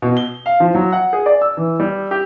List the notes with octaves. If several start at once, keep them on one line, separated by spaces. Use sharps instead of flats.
B2
G7
F5
F3
F#3
F#5
G#4
D5
E6
E3
G3
G4